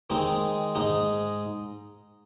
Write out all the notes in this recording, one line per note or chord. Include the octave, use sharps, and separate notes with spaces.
D#3 G#3 C4 D#4
G#2 G#3 D#4